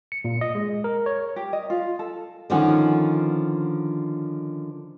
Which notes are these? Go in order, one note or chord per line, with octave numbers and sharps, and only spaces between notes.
C#7
A#2
D#5
G#3
A#4
C#5
G4
D#5
F4
A4
D3 D#3 F3 C#4 F#5